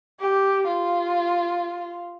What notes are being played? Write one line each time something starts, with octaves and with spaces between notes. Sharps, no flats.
G4
F4